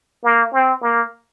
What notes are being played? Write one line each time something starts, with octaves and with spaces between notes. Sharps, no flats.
A#3
C4
A#3